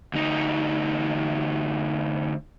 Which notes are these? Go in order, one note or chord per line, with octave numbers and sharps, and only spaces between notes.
D2 D#4